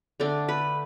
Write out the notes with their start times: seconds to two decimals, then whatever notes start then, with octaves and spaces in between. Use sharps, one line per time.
0.20 D3 A3 D4
0.49 B4